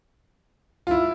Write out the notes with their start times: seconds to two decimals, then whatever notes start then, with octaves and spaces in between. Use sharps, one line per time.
0.87 F4
0.91 E4